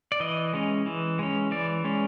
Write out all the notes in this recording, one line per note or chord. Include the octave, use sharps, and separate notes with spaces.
D5
E3 D#5
G#3 C#4
E3
G#3 C#4
E3 D5
G#3 C#4